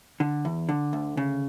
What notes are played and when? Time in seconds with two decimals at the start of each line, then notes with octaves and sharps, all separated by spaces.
0.20 D3
0.45 E2
0.69 D3
0.93 D2
1.17 C#3